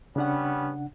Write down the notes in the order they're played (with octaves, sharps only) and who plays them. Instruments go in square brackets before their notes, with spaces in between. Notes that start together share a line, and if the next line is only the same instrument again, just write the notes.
[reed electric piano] C#3 D4 F#5 [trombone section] G3 B3 C#4